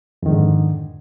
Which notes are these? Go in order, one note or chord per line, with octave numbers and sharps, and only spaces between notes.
F2 G#2 D3 D#3